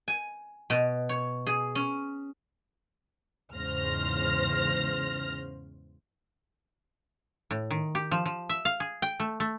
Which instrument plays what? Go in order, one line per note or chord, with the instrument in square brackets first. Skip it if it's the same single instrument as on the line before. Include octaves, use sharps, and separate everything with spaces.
[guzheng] G#5
B2
C#5
G#4
C#4
[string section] E2 G#2 C#3 C5 F6 A#6
[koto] A2
D#3
G4
F3
F3
E5
F5
G#4
G5
A3
A3